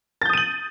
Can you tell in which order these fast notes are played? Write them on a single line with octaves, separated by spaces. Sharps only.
A6 G6 D#6 D#7 F#7